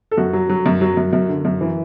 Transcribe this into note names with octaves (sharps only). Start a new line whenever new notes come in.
A4
F#2 F#4
F#3
F#3
F#2
F#3
F#2
F#2
D3
F#2
E3